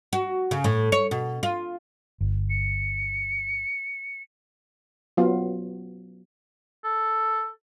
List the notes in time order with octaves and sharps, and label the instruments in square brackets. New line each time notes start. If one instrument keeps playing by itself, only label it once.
[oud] F#4
C#3
A2
C#5
B2
F4
[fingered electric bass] G1
[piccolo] C#7
[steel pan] F#3 B3 F4
[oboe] A4